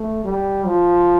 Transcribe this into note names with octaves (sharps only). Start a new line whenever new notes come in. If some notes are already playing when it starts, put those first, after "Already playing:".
Already playing: A3
G3
F3